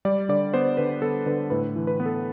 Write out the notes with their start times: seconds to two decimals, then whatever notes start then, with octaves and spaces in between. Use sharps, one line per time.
0.05 G3 D5
0.29 D3 D5
0.54 B3 C5
0.77 D3 B4
1.02 B3 A4
1.26 D3 B4
1.50 A2 B4
1.76 E3
1.87 B4
2.00 B3
2.06 A4